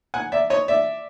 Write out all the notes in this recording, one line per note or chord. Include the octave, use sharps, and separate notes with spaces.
F#5 G#5
D5 E5
C#5 D#5
D5 E5